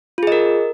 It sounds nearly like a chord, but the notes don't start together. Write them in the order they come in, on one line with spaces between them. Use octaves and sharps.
F4 G#4 D#5 A#4